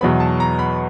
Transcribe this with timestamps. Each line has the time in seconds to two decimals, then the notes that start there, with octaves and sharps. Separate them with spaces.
0.01 E2 B2 F#3 B3 B5
0.20 A5
0.40 A#5
0.59 B5